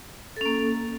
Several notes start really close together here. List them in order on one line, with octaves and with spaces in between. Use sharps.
A4 C#4 A#3